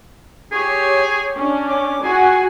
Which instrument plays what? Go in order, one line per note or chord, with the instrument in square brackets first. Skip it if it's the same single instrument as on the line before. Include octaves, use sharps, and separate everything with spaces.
[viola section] G4 C#5 [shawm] G#4
[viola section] C#4 D4
[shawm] D6
[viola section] F#4 G#5 [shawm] G#4